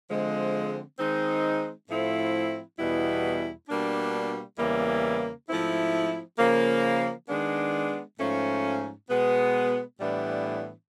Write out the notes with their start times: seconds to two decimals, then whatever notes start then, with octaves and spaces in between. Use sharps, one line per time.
0.09 D3 F3 G#3 C4
0.99 D#3 G#3 C4 D#4
1.89 A2 F3 A3 C4 E4
2.78 E2 B2 G3 B3 E4
3.69 B2 G3 A#3 D4
4.58 E2 C#3 E3 G3 A#3
5.49 G#2 F3 A3 C4 E4
6.39 C#3 F3 A#3
7.28 D#3 G#3 B3 D4
8.19 G#2 F3 A3 C#4
9.09 B2 G#3 B3
9.99 A2 E3 G3 B3 D4